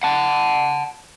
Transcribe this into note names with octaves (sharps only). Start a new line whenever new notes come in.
F#5 A5